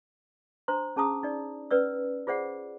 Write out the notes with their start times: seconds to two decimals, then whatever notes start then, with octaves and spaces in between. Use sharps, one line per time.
0.68 D4 C5 A#5 C6
0.96 C#4 G#4 A5 A#5 D#6
1.23 D#4 D5
1.71 C#4 B4 D5 E6
2.27 F4 G#4 C5 D5 F#5